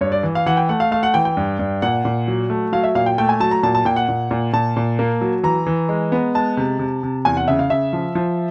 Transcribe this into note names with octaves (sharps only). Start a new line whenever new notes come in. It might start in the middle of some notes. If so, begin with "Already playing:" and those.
G2 C#5
D5
E3
F5
E3 F#5
G5
A3 F#5
F5
A3 F5
F#5
E3 G5
G5
G2
G2
A#2 F#5
A#2
F#3
A3
F#3 F5
E5
A#2 F5
G5
A3 G5
G#5
F#3 A5
A#5
A#2 A5
A5
A#2 G5
F#5
A#2
A#2
A#2 A5
A#2
A#3
F#3
E3 A#5
E3
G#3
B3
G#3 A5
C3
C3
C3
E2 G#5
F#5
C#3 E5
F5
C#3 E5
F3
F3